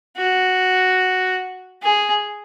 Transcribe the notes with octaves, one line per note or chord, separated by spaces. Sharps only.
F#4
G#4